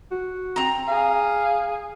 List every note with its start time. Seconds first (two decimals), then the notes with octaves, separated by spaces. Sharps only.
0.11 F#4
0.56 C4 A#5
0.88 G#4 F5